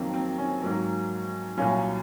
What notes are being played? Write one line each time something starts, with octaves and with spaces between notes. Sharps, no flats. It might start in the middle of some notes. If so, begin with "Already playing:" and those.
Already playing: F2 D#3 F#3 A#3 C4
C4
C#4
G#2 F#3 A#3
C2 A#2 F#3 C#4 F4